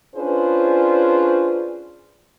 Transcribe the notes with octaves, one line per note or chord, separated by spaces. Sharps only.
C#4 D4 F4 G#4 B4 C5